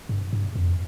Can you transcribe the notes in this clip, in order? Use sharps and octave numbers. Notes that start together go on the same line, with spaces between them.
G2
G2
F2